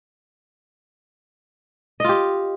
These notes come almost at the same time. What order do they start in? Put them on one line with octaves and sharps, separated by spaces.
D#5 F4 G4